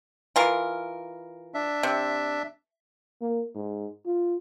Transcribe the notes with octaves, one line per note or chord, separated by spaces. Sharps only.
E3 F4 A#4
D4 E5
C3
A#3
G#2
F4